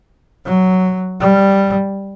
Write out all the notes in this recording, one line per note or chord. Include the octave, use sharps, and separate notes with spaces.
F#3
G3